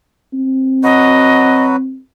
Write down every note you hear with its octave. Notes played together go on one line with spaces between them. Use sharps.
C4
F#3 F#4 B4 D#5